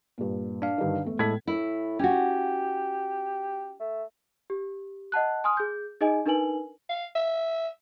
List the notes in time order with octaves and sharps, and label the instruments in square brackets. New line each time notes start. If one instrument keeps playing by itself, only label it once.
[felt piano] G2 A#2
[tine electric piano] D4 F5
[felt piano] G2 D3 D#3
E1 A3
[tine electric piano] A2 G#3 A4 [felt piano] G#6 B6
[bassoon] A2 [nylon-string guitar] E4
[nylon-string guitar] C#4 F#4 [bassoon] G4
[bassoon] A3
[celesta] G4
D#5 F#5 A5 F#6
G#5 C6 D#6 F6
G#4 G6
D#4 G#4 D#5 G#5
D4 D#4 A#4 B4 G#5 F#7
[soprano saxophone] F5
E5